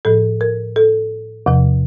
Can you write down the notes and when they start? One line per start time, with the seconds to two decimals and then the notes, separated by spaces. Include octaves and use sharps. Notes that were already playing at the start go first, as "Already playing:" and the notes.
0.05 A2 F3 A4
0.41 A#4
0.76 A4
1.46 E2 C3 F3